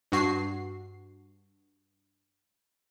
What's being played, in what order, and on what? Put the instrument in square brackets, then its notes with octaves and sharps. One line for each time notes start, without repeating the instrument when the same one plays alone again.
[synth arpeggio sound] G2 F#4 C7